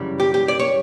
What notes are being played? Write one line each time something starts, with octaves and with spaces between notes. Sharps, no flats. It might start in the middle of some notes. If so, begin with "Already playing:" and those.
Already playing: F#2 C#3 E3 G3
G4
G4
D5
C#5